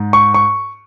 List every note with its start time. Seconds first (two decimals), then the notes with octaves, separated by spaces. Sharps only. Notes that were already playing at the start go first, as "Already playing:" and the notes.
Already playing: G#2
0.13 C#6
0.34 C#6